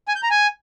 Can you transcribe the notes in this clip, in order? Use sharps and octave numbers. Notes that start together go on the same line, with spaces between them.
G#5
G6
A#5
G#5